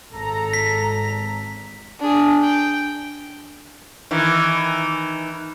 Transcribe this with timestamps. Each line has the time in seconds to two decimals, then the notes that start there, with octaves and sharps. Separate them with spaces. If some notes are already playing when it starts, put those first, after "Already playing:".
0.12 G#1 A4 A#5
0.53 B6
1.99 D4 G#4
2.42 G5
4.11 D#3 E3